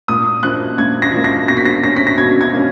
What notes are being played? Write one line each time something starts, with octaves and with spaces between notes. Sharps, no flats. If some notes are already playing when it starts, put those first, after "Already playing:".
A#2 D#6
F3 A#3 F#6
A#2 G#6
A#6
F3 A#3
A#6
B2 A#6
B6
A#6
A#3 C#4 A#6
B6
A#6
B2 G#6
G#6
A#3 C#4